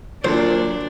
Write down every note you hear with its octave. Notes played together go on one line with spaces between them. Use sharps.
A#2 F#3 D4 C5